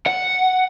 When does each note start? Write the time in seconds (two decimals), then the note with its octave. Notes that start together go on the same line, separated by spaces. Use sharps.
0.07 F#5